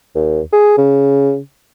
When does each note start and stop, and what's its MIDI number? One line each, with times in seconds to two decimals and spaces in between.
0.15 0.40 39
0.53 0.76 68
0.78 1.38 49